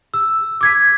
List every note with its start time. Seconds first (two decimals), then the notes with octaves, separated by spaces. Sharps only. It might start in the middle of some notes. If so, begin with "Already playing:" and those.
0.14 E6
0.61 D6 G#6 B6